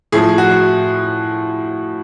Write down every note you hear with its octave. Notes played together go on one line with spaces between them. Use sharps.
A2 F3 G#4
F#4